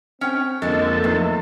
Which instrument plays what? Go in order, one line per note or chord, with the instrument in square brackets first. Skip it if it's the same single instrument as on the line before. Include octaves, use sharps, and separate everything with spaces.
[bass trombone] C4 [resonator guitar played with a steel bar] C#4 G5
[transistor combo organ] F2 A4 [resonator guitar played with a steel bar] D3 G#3 [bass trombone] A#3
[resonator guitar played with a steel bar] E2 [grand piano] A3 D#4 B4